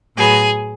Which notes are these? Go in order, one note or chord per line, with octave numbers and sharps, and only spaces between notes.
A2 F#3 B3 G#4